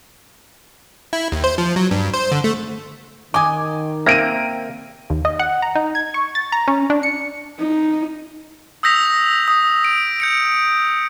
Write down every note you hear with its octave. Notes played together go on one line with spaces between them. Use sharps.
E4
D#2
C5
F3
F#3
G2
C5
D3
A3
D#3 D#5 G#5 D6
A#3 C4 E5 A#6 D7 D#7
D#2
D#5
F#5
A#5
D#4
G#6
C#6
A6
A#5
C#4
D4
C#7
D#4
D#6 E6 G6 A#6 B6 F7
D#6
D7
G6 C#7 D7